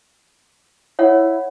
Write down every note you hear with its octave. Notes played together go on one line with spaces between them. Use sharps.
E4 C#5 F#5